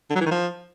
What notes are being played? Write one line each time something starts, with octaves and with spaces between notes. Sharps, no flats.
D3
F#3
E3
D#3
F3